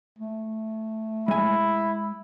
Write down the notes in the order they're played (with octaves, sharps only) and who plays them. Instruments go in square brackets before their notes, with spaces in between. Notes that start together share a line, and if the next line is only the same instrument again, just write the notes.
[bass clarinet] A3
[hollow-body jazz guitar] G#3 G#5 [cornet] E4